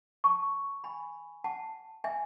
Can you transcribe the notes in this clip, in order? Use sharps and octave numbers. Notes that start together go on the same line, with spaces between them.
A5 C#6
G#5 B5
F#5 A5
E5 G#5